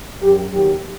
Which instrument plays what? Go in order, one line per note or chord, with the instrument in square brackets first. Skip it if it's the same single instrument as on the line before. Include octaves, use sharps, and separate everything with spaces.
[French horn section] F#2 F#3 G4
D#2 D#3 F#3 G4